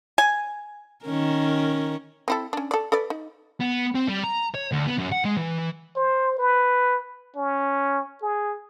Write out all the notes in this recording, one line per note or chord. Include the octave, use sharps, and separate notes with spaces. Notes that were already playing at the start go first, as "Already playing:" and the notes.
G#5
D#3 C#4 A#4
C4 E4 A4
C#4 D4
A4 D5
A4 B4 D5
D#4
B3
C4
G3
A#5
C#5
D2
B3
F#2
F#5
G#3
E3
C5
B4
C#4
G#4